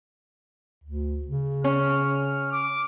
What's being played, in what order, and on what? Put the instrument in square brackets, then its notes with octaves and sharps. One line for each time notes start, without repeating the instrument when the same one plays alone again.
[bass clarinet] D2
C#3
[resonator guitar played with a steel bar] C#4 [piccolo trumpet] F6
[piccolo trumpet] D6